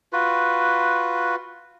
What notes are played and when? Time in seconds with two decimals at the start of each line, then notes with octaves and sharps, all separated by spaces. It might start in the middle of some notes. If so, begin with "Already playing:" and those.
0.13 F4 F#4 B4